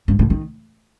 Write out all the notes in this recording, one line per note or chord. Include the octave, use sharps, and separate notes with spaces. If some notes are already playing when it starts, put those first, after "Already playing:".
G2
A2
D#3